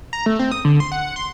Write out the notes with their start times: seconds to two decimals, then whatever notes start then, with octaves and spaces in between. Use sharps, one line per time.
0.13 A#5
0.26 A3
0.39 C4
0.52 D#6
0.65 D3
0.80 C6
0.92 F#5
1.16 C6